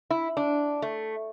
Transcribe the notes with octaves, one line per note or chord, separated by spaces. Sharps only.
E4
D4
A3